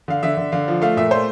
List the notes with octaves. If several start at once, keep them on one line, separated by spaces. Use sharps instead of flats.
D3 F5
D3 E5
D3
D3 F5
F3
A3 F5
A#2 E5
A3 C5